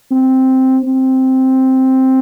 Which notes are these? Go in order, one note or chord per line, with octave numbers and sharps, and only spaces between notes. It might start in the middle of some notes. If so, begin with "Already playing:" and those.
C4
C4